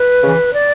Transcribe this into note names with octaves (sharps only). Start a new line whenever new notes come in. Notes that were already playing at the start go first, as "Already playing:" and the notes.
Already playing: B4
C#3 E3
D5